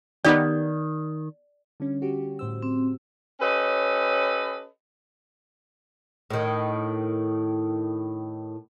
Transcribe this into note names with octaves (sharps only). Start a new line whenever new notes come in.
D#3 B3 D#4 G4 D5
D3 G3 C#4
F#4 G4
A2 C5 E6
C4
C#4 G4 A4 B4 C#5 D#5
A2 D#3